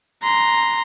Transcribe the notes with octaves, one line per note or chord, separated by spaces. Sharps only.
A#5 C6